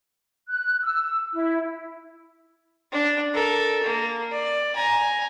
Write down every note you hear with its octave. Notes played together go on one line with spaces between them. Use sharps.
F#6
E6
E4
D4
A4 A#4
A#3
D5
G#5 A#5